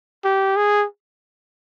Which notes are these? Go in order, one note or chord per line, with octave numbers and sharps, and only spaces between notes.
G4
G#4